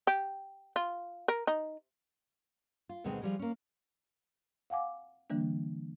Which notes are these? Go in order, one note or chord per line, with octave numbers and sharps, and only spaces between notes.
G4
F4
A#4
D#4
F4
D2 B2 D#3 G#3 C4
F3 G3 G#3
A#3 C#4
F5 F#5 G#5 D6
D3 E3 G3 A#3 D4